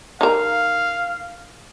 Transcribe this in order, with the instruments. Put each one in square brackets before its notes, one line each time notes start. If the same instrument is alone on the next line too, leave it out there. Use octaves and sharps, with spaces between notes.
[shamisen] D#4 A#4 [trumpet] F5